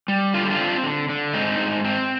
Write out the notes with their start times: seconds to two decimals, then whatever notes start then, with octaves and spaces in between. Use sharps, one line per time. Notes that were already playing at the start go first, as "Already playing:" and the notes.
0.08 G3
0.34 D3 F4
0.43 G4
0.51 D4 F4
0.59 C4
0.84 D3
1.09 D3
1.34 G#2 C4 D#4
1.59 G#2
1.84 C4